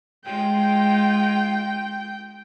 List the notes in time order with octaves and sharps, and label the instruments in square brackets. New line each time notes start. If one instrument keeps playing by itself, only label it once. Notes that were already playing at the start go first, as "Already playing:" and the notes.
[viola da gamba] G#3 F4 [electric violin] G5